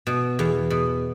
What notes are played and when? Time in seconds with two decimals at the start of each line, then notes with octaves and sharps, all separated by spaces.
0.07 B2
0.39 E2
0.70 B2